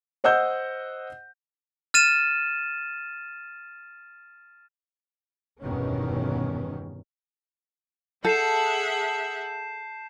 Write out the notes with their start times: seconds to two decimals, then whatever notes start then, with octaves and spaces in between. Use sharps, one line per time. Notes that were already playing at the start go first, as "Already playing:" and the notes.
0.24 C5 D#5 F#5 E6 G6
1.94 F6 A6 D#7 E7
5.61 F1 E2 G2 B2 D#3 C#4
8.25 G#4 A4 E5 F#5 A5 G6 C7 E7